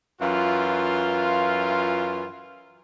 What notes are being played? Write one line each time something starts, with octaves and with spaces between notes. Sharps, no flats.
F#2 E3 F4